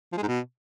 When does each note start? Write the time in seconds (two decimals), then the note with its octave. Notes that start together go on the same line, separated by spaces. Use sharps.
0.12 F3
0.18 G#3
0.23 G#2
0.28 B2